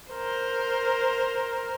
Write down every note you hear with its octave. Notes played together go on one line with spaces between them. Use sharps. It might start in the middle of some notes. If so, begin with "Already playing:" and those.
A#4 C5